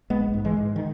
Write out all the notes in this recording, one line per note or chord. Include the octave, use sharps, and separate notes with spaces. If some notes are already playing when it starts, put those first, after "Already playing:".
A#1 G#3 B3
G#2
E3 G#3
G#2
D#3